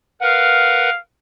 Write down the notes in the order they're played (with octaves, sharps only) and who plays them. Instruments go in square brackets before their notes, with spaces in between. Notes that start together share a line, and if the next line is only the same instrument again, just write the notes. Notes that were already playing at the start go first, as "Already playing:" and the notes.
[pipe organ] A#4 B4 F#5 [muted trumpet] F5